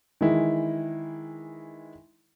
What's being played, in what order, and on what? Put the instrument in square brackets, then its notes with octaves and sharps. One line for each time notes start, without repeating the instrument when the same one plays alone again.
[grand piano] D#3 E3 G#3 E4